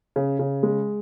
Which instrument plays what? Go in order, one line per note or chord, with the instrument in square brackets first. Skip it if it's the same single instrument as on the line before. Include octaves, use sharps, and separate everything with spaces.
[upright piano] C#3
C#3
G#3